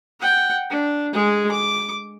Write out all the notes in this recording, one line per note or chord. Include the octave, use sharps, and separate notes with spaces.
F#5 G5
D4
G#3 G#4
D6